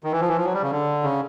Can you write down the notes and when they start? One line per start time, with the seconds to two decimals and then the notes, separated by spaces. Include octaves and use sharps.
0.04 D#3
0.12 E3
0.20 F3
0.28 E3
0.37 F3
0.44 F#3
0.54 G3
0.62 C#3
0.71 D3
1.03 C#3